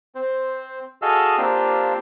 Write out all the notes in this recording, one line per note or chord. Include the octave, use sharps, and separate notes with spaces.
C4 C5
F#4 G#4 A4 D#5 F5 E6
A#3 C4 D4 F4 G4